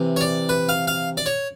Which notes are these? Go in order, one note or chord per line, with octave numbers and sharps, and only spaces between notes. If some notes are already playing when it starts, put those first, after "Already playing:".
Already playing: C3 E3
C#5
D5
B4
F5
F5
D5
C#5